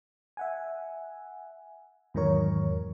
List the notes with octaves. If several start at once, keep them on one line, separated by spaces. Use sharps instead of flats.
E5 F#5 G#5
E2 G#2 D#3 F#3 A#4 C#5